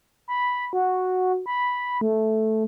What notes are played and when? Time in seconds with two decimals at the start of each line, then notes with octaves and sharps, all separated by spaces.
0.28 B5
0.73 F#4
1.46 B5
2.01 A3